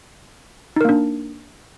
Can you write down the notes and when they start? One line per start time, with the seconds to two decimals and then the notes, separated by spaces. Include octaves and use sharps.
0.76 D#4
0.81 A#4
0.85 A#3
0.89 D4